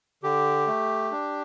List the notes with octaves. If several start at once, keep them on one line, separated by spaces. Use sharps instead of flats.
D3 G4
A3
D4